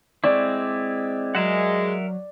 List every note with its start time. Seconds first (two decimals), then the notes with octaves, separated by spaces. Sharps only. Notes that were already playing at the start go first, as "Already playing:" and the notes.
0.24 G#3 C4 E4 D5
1.35 F#3 G#3 A#4 E5 F#5